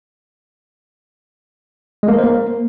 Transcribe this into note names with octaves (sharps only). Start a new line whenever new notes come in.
G#3
A#3
A#4
C5
A#3